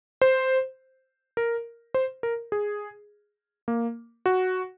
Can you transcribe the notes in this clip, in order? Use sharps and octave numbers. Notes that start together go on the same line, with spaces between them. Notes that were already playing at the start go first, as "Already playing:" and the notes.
C5
A#4
C5
A#4
G#4
A#3
F#4